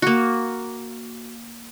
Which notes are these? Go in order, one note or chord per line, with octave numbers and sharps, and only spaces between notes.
A#3 F#4